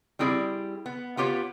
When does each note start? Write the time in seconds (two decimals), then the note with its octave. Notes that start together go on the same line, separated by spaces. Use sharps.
0.19 G3 C4 E4 G#4 D5
0.86 B3
1.17 B3 F4 G4 C#5